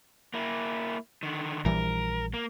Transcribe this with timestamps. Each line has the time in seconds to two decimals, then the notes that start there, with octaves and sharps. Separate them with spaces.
0.34 A#3 E4
1.23 D3 D#3
1.65 A#1 E3 G3 A#4
2.34 A#3